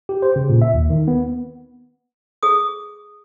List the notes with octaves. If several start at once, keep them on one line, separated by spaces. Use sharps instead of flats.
G4
C5
C#3
A#2
E5
D#2
D#3
B3
G#4 D#6